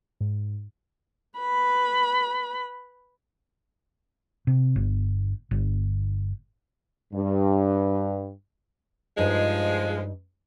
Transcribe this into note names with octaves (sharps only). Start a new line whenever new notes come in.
G#2
B4 B5
C3
G1
G1
G2
G2 F3 G#3 D#4 D#5